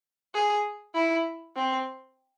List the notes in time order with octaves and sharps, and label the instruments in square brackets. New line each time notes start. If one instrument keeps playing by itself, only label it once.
[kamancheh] G#4
E4
C4